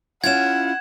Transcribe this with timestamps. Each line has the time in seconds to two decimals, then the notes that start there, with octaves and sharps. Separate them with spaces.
0.24 C#4 E4 F4 F#5 G#6 E7